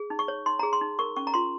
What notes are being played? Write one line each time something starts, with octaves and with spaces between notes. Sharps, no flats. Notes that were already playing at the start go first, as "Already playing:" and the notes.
Already playing: G#4
D#4
C#6
C#5
D#4 C6
G#4 A#5
C6
D#4
A#4 C#6
C#4 C#6
A#5
F4 C6